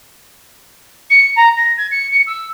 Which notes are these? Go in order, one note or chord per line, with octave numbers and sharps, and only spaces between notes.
C#7
A#5
A#6
G#6
C#7
C#7
E6